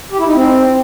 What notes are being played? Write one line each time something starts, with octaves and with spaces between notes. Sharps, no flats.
G4
E4
D#4
C4